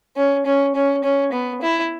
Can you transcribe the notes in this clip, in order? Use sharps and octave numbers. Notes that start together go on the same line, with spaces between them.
C#4
C#4
C#4
C#4
B3
E4